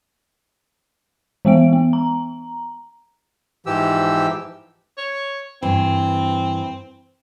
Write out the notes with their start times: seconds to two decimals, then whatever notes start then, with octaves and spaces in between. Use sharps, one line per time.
1.45 E3 G#3 B3 D7
1.73 B3
1.93 A#5
3.66 G#2 E3 F3 G4 E6
4.98 C#5
5.63 G2 E3 C4